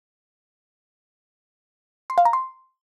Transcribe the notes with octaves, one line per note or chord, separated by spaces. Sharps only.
C6
F5
A#5
C6